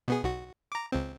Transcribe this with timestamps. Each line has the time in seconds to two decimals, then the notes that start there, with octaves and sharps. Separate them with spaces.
0.08 B2 B3 G#4
0.23 B1 F#4
0.72 A#5 D6
0.92 C#2 C4